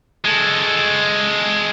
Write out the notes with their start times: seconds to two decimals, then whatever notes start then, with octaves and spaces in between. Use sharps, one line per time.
0.25 G#3 A4